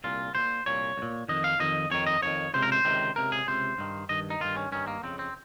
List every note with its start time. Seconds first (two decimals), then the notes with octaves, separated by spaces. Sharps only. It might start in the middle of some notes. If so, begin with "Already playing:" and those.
0.04 C2 A#2 F4
0.35 C2 C5
0.38 A#2
0.66 C2 A#2 C#5
0.98 C2
1.02 A#2
1.29 F2 D#3 D#5
1.44 F5
1.60 F2 D#3 D#5
1.91 F2 D#3 C#5
2.07 D#5
2.22 F2 D#3 C#5
2.54 C#2 C3 C5
2.62 A#4
2.72 C5
2.85 C#2 C3 D#3
3.16 C#2 C3 A#4
3.32 G#4
3.47 C#2 C3 C5
3.78 G2 D#3
4.09 G2 D#3 D#5
4.30 D#4
4.40 G2 D#3 F4
4.56 C#4
4.72 G2 D#3 C#4
4.87 A#3
5.03 F2 C#3 C4
5.19 C4